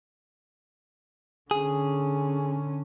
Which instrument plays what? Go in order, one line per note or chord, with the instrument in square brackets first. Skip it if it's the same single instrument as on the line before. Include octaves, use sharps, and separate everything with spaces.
[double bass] D3 C#4 [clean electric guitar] G#4